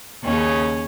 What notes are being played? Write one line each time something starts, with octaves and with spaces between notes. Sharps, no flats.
D#2 C#3 C#4